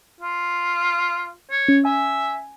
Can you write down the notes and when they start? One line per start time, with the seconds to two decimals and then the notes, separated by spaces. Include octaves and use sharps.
0.21 F4
1.50 C#5
1.68 C#4
1.85 E5 G#5